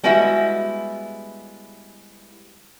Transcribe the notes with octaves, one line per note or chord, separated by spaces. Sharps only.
G3 G#3 B3 E4 F#4 E5